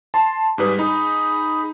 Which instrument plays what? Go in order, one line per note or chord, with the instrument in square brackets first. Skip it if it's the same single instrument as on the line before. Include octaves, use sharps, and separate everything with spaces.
[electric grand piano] A5 C6
[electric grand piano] G#2 G3 B4 [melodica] G#4
[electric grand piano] D#4 [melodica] G#4 B5